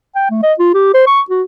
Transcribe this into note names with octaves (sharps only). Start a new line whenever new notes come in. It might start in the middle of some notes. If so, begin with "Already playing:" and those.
G5
A3
D#5
F4
G4
C5
C#6
F#4